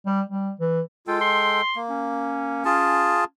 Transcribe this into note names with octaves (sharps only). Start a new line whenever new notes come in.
G3
G3
E3
G#3 F4 A4 G5
C6
A#3
C#4
F4 G#4 A5